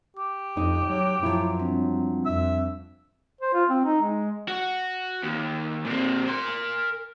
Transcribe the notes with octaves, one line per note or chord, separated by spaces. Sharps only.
G4 D6
F2 D#4
F#3
F#2 F3 F#3 E4
G3 C4 D4
F2 E5
C5
F4
C4
D#4
G#3
F#4
D#2
A#2 C4
A#4 C6